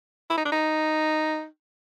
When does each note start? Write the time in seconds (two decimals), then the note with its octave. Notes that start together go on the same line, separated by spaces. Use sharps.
0.30 E4
0.38 D#4
0.45 D4
0.52 D#4